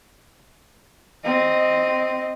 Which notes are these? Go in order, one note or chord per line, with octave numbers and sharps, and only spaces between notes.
C4 D#5